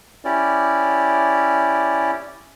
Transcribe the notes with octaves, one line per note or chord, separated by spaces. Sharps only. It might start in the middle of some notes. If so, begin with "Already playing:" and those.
C#4 E4 G4 D5